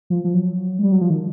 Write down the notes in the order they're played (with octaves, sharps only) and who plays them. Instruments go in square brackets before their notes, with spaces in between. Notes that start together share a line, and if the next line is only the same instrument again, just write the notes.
[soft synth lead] F3
F3
F#3
G#3
G3
F#3
F3
D#3